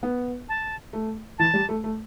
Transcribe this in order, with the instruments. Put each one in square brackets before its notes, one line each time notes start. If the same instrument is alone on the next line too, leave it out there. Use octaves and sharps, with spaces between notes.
[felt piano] B3
[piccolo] A5
[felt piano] A3
[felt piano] E3 [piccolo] A5
[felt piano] G3
A3
A3